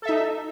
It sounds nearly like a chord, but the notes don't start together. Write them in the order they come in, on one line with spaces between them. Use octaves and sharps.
A4 E5 D#4